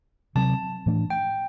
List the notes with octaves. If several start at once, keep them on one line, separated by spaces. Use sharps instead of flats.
C3 F#3 C4 A5
A2 E3 A3 D4
G5